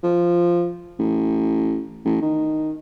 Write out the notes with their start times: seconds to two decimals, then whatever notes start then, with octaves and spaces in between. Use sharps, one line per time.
0.03 F3
0.99 A1
2.05 A1
2.22 D#3